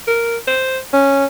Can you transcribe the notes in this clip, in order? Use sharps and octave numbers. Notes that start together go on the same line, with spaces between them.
A#4
C5
C#4